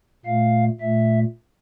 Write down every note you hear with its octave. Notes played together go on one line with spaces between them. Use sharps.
A#2 A3 F5
A#2 A3 E5